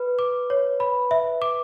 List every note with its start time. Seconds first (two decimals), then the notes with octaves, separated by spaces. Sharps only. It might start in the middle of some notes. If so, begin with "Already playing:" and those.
Already playing: B4
0.19 D6
0.50 C#5
0.80 B5
1.11 E5
1.42 D6